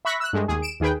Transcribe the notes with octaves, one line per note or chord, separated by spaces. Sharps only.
E5 B5 C#6 F#6 A#6 B6
E6 F#6
G2 G#3 A3
D#2 G#4
D7 E7
D#2 D#3 G#4 B4 G5